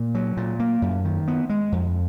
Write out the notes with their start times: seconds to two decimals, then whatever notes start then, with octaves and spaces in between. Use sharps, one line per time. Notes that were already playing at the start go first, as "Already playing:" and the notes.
Already playing: A#2
0.15 F#3
0.37 A#2
0.60 A#3
0.82 F#2
1.05 D#3
1.28 B3
1.50 G#3
1.72 F2